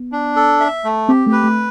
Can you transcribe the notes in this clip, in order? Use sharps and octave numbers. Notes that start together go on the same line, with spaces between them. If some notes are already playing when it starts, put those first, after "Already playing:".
Already playing: B3
D4
A4
E5
A3
C4 G4
A3
B4
A3